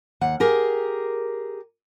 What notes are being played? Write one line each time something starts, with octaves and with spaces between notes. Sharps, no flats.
D#2 F#5
G4 G#4 A#4